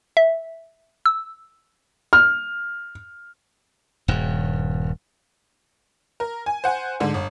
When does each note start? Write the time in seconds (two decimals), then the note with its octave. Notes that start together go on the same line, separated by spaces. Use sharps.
0.17 E5
1.06 E6
2.13 F6
4.08 D#1 G2
6.20 A#4
6.46 G#5
6.64 C5 F#5 G#5
7.00 G#2 D3
7.14 G1